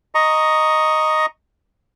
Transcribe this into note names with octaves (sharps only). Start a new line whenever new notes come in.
D#5 A#5 C#6